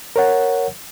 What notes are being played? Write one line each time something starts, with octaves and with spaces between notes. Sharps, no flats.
A#4 C#5 F#5